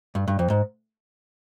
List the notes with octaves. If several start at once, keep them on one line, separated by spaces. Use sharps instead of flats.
G2
G2
F2
G#2